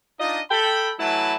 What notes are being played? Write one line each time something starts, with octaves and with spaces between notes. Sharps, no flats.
D4 D#4 F4 D#5
A4 G5 B5
E3 F#3 A3 E4 B4 A5